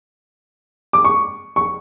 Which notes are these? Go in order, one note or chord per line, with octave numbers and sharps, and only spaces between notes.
D6
C#6
C#6